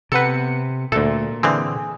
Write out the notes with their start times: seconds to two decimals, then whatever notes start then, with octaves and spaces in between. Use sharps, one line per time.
0.12 C3 B3 A4 B4 C#7
0.92 D2 A#2 A3 A4
1.43 D3 E3 C4 G#4